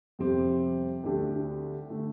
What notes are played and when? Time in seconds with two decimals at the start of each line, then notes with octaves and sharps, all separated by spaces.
0.19 F2 C3 G3 C4 G4
1.04 D2 D3 A3 D4 G4
1.90 D3 A3